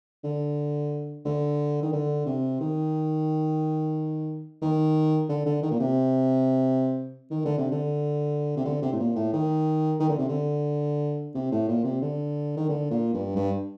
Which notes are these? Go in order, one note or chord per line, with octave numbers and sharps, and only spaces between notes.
D3
D3
D#3
D3
C3
D#3
D#3
D3
D3
D#3
A#2
C3
D#3
D3
C3
D3
C3
D3
C3
A2
A#2
A2
D#3
D#3
D3
C3
D3
C3
A2
A#2
C3
D3
D#3
D3
A#2
G2
G2